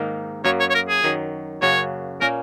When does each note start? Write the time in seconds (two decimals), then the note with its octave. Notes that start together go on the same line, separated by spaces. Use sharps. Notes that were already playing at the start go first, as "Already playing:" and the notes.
Already playing: G#2 D#3 A#3 D#4 A#4
0.45 F#2 F#3 A#3 C#5
0.60 C#5
0.70 C#5
0.75 A#4
0.89 G#4
1.04 F#2 D#3 F#3
1.62 F#2 C#3 A#3 F#4 C#5
2.21 A#2 A#3 C#4 A#4